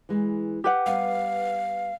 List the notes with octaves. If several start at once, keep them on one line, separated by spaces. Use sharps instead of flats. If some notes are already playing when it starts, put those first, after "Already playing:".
E3 G#3
G4 B4 F#5
G3 B3 F5